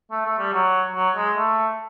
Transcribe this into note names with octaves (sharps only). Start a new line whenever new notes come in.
A3
A3
G3
F#3
F#3
G#3
A3